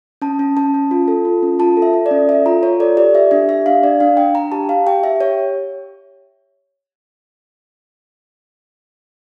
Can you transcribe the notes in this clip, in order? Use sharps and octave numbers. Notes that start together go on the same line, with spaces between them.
C#4 A5
C#4
C#4 A5
C#4
F4
A4
F4
C#4
F4 A5
A4
E5
A4
D5
C#4
A4 E5
F4 A#5
F4 C#5
A4 D5
G4 D5
G4 E5
D4 E5
G4 E5
D4 F5
D4 D5
D4 F5
D4 G5
D4 A#5
G4 A5
G4 F5
G4 G5
G4 E5
G4 C#5